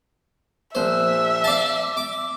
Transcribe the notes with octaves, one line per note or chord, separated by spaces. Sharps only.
A#1 C5 E5
D5 F5 A5
D6